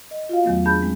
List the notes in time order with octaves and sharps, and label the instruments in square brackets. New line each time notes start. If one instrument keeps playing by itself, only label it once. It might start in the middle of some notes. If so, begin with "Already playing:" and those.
[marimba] D#5
F4 F#4 F5
E2 D#3 F#3 A3 B3
D4 G#4 A5 B5 G6
G#3 C4